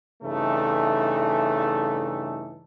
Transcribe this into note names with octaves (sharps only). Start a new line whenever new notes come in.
G2 C#3 E3 A3 D#4 A4